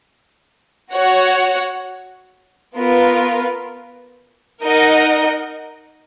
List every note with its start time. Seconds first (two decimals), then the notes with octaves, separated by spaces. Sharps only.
0.93 F#4 C#5 F#5
2.77 B3 F4 A#4
4.62 D#4 A#4 D#5 F#5